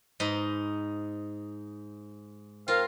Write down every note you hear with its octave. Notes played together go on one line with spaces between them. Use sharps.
G#2 D#4 B5
C4 F4 A#4 F5